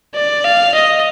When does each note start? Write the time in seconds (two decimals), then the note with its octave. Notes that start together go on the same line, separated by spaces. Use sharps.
0.15 D5
0.44 F5
0.75 D#5